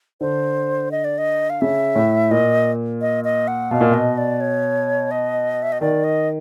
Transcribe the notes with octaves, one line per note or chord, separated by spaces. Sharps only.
D3 C5
D#5
D5
D#5
F5
C#3 E5
A2
A#2 D#5
D#5
D#5
F#5
B2 F5
A#2
B2 D#5
D5
C#5
D#5
E5
D#5
D#3 D5
D#5